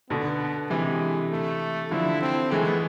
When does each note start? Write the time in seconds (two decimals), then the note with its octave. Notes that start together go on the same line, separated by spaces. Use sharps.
0.10 B2 D3 B3
0.70 C3 E3 G#3
1.31 A3
1.91 D3 F3 E4
2.22 C4
2.51 E3 G#3 A3
2.66 G#3 B3